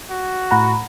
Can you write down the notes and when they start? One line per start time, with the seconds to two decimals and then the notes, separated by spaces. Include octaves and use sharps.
0.10 F#4
0.51 A2 F#5 A#5 B5